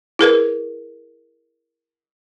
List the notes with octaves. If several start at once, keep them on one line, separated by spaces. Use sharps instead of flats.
E4 G#4 A#4 B4